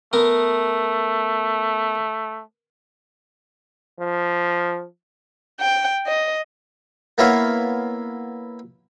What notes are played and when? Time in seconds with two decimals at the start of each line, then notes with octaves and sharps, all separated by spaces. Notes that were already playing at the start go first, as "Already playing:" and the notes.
0.13 A3 B3 A#4
4.00 F3
5.60 G5
6.07 D#5
7.18 A#3 B3 E4 C#5 E5 F5